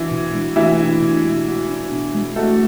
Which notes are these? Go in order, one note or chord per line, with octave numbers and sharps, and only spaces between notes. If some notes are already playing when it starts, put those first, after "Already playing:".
Already playing: E3 D4 E4 F#4
B2
G#3
E3 E4 F#4
D4
B2
G#3
F#4
D4
B2
G#3
A3 F#4 A4